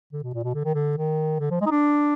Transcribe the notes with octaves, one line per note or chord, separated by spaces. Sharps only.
D3
B2
A#2
B2
D3
D#3
D3
D#3
D3
F3
G#3
D#4
D4